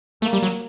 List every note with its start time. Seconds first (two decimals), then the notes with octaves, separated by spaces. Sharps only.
0.22 A3 A#3
0.33 G3
0.42 F#3